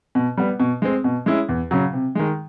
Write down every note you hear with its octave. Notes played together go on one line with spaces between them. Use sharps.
B2
G3 B3
B2
G#3 C4
B2
G#3 C#4 E4
E2
C#3 F#3
C3
D#3 G#3